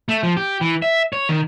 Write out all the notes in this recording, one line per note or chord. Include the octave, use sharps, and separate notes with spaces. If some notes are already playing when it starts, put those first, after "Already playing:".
A3
F3
G4
E3
E5
C#5
D#3